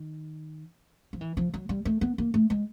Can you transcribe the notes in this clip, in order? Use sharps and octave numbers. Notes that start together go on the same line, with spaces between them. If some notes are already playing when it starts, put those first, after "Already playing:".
Already playing: D#3
F3
E3
F3
F#3
G3
A3
B3
A#3
A3
G#3